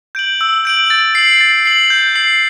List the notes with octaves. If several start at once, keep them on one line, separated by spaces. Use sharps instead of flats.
G6 D7 F#7
E6
G6 D7 F#7
A6
C7 F#7
A6
C7 F#7
G6
C7 F#7